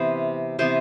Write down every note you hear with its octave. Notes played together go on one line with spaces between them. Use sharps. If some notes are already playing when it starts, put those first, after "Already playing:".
Already playing: C3 E3 B3 C5
C3 E3 B3 C5